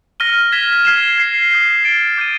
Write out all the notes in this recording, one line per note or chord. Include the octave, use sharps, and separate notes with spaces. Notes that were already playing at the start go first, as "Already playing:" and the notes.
F6 A#6 D#7 G7
G#6 B6 E7 G7
F6 G#6 C7 E7
G#6 C7 E7
D#6 G6 C7
A6 D7 G7
D6 G6 C7 D#7